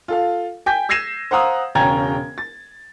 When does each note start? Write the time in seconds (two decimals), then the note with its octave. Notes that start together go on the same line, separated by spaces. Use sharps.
0.08 F4 A4 F5
0.66 G5 G#5 G6 B6
0.89 E6 G#6 A#6 C7 D#7 E7
1.31 C5 F5 F#5 A#5 D#6 E6
1.75 E1 C#3 C#4 G5 A#5 G#6
2.38 A6